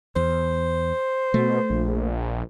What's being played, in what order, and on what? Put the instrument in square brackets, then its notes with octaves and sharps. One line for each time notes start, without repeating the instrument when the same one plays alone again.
[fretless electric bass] E2 [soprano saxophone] C5
[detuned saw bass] B2 [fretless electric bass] A3
[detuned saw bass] A#1